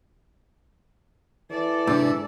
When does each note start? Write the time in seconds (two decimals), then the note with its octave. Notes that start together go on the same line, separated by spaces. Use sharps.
1.51 E3 A4 D5
1.87 G#2 C3 D4 E6